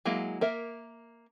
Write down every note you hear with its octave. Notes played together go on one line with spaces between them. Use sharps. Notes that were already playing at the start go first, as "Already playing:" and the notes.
F#3 G#3 A#3 E4
A#3 A#4 E5